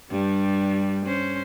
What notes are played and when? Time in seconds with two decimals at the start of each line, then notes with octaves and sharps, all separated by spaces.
0.11 G2 G3 D4
1.05 C#4 C5